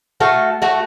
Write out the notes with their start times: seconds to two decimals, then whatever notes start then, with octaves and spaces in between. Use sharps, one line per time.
0.20 A3 F#4 A4 F5
0.62 A3 F#4